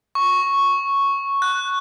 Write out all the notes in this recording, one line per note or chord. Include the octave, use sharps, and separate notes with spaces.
C#6
F#6